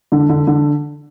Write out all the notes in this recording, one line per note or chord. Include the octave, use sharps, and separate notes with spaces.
D3
D3
D3